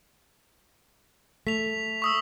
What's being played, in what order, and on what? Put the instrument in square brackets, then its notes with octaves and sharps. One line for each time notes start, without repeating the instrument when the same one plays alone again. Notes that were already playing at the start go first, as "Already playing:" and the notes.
[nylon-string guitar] A3 [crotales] B6 F7
[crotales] C#6 D#6 E6